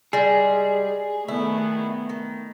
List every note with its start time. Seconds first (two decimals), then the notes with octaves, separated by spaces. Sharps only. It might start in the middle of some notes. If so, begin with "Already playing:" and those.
0.13 G3 G#3 G#4
1.28 D#3 A3 B3 E4
2.09 D#3